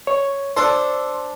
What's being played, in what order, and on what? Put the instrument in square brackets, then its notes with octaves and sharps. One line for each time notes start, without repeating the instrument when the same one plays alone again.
[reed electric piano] C#5
[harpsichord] D4 A4 C5 [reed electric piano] C6